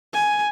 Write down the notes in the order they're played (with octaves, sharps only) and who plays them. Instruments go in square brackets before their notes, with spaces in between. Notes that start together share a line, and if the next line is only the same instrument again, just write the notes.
[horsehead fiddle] G#5